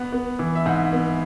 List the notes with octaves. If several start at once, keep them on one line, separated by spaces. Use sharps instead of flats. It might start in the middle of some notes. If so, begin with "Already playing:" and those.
Already playing: B3 F#5
B3
E3
E5
G#2 F#5
B3